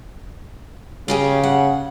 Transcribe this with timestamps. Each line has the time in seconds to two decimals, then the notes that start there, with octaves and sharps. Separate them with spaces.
1.08 C#3 F4 G4 G#4
1.44 F#5